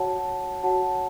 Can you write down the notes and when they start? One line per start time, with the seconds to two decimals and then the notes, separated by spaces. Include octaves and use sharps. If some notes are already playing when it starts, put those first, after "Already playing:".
Already playing: F#4 C#5 F#5 A5
0.63 F#4 C#5 F#5 A5